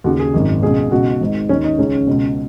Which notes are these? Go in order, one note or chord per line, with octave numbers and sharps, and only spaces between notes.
D#2 C#3 F#4
G#4
G#1 F#2 D#3
C#2 B2 G#4
C#2 B2 F#4
G#1 G#2 D#3
D#2 D#3 C#4
D#4
C#2 C#3 C#4
C#2 B2